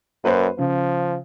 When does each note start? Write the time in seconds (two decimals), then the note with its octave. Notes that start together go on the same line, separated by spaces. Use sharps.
0.24 F#2 A#3 B4 C5
0.58 C#3 F3